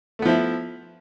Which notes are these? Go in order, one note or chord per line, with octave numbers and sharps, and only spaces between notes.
F3 A3 B3 E4